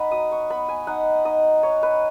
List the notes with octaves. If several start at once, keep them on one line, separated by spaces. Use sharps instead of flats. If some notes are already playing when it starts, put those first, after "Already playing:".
Already playing: D#4 D#5 F#5 B5
F#3 D#6
C#6
B3 B5
G#5
D#4 F#5
D#4 D#5
D#4 C#5
B4